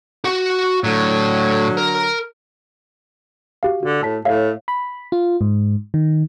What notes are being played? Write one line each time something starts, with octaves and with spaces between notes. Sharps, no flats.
F#4 F#5
A2 D3 F#3
A#4
F#4 G4 F5
D3 F#4
A2 A5 B6
A2 C#5 E5 F5
B5
F4
G#2
D#3